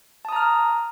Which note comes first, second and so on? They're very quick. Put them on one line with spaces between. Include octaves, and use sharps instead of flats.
A5 D#6 A#5 F6